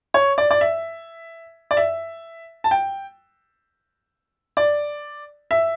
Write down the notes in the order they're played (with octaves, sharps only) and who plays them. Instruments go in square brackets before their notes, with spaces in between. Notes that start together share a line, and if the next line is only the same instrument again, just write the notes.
[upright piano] C#5
D5
D5
E5
D5
E5
A5
G5
D5
E5